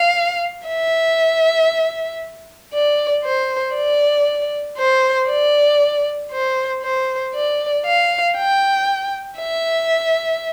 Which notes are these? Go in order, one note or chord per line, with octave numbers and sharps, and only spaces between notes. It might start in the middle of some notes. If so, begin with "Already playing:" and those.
Already playing: F5
E5
D5
C5
D5
C5
D5
C5
C5
D5
F5
G5
E5